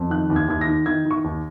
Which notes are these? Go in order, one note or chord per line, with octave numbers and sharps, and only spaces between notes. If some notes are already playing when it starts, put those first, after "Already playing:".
Already playing: F2
D#3 F#6
D#2
G#6
D#2 G#6
A#6
D#3
D#3 G#6
D#3
C#6
D#2